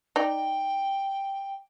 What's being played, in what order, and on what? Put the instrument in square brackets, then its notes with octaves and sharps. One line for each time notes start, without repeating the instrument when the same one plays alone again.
[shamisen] D#4 D5 [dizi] G5